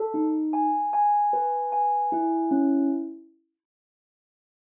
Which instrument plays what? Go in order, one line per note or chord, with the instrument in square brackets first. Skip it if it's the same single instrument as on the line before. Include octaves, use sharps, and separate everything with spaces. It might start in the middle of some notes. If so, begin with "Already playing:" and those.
Already playing: [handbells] A4
D#4
G#5
G#5
B4
G#5
E4
C#4